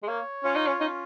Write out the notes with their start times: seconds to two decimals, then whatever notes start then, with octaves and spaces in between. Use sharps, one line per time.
0.03 G#3
0.08 A#3 C#5
0.44 C#4 F4
0.55 D#4
0.67 C#4
0.80 C#4 D#4